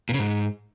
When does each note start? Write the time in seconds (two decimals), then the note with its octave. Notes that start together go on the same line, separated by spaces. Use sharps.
0.09 A#2
0.14 C#3
0.19 G#2